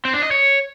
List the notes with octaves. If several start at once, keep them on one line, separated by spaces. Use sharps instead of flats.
C4
D4
D#5
C#5